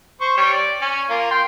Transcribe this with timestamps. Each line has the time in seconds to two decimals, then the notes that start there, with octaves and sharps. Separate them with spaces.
0.21 C5 C#6
0.37 G3 C#5
0.53 D5
0.81 C#4
1.10 A#3 F4
1.31 G5 C6